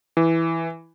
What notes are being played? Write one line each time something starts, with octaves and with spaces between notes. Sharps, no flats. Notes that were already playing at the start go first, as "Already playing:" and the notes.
E3